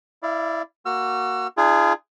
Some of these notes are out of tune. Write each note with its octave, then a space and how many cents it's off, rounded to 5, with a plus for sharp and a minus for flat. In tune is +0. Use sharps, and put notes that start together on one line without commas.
E4 +0 D5 +0 F5 -30
A#3 +0 F#4 +0 E6 +40
D4 +40 F4 -35 G#4 +0